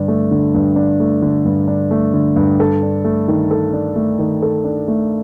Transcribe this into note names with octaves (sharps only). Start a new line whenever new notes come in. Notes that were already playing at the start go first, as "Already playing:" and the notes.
Already playing: G2 D3 D4
A3
D3
G2
D4
A3
D3
G2
D4
A3
D3
G2
A4
D4
A3
D#3
A4
D4
A3
D#3
A4
D4
A3